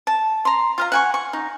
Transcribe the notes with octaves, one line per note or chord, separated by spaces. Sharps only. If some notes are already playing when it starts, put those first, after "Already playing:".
A5
A#5 C6
F4 F5 A#5
F#5 G#5 C#6
C#6
D#4